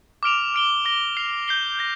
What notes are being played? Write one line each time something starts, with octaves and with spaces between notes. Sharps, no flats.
D6 F6 D7 F7
F6 D7 G7
D6 A#6 G7
F6 C7 F7
G6 C7 G7
G6 A#6